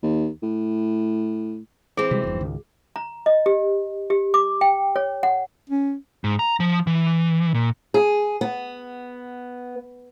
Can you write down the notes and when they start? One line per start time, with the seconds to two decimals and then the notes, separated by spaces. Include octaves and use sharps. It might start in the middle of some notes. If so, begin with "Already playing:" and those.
0.03 D#2
0.43 A2
1.97 E3 C4 G#4
2.11 C3 G3 G#3 F#4
2.23 F1 E2 G2
2.41 C#2 G#2 D#3
2.96 A#5
3.26 D#5
3.46 G4
4.10 G4
4.34 D6
4.61 G5
4.96 C#5
5.23 F#5
5.70 C#4
6.24 G#2
6.39 A#5
6.60 F3
6.87 E3
7.54 A#2
7.94 G#4
8.41 B3